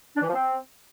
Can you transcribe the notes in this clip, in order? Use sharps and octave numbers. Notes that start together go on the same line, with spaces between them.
D4
E3
F3
C4